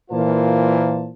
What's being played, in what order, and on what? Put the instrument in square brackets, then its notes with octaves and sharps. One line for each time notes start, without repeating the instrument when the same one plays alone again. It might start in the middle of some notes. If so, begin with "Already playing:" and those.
[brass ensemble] A#2 E3 A#3 F4 C5 A5